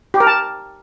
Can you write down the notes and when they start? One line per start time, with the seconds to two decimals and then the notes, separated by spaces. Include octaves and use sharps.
0.14 G4
0.20 A#4
0.27 A5